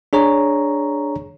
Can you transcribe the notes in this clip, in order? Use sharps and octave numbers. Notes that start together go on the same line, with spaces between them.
D4 G#4 C#5 A#5